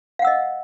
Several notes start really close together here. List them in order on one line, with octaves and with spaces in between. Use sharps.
F5 F#5 E6 D#5